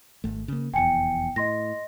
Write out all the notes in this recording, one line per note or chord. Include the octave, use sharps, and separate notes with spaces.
G#1 A3
C#3 A#3
F1 E2 G5 G#5 C#7
A2 D#5 C6 A#6